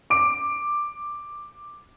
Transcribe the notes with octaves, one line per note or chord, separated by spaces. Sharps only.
D6 D7